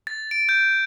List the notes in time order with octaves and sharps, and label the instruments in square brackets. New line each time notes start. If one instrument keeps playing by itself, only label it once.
[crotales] A6
D7
G6